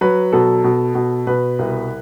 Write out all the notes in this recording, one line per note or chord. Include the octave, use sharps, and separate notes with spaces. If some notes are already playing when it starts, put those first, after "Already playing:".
F#3 B4
B2 A4
B2
B2
B2 B4
C2